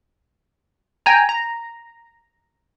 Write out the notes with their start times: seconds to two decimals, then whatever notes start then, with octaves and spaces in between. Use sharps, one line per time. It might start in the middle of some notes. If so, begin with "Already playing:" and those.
1.06 G5 G#5 A#5
1.29 A#5